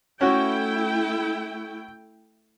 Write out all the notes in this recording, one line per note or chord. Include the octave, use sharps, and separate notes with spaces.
A3 C#4 E4 F#4 G5